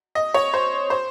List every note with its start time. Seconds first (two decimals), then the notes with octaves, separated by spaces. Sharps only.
0.15 D#5
0.34 C#5
0.54 C5
0.90 C5